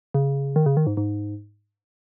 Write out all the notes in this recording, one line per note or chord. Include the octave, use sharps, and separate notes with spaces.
C#3
D#3
C#3
D#3
G#2
G#2